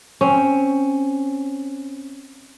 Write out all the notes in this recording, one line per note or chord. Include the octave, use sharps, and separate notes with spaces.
C4 C#4